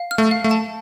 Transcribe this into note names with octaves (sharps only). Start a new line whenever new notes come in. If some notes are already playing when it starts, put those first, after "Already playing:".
Already playing: F5
F6
A3
F5
A3
A5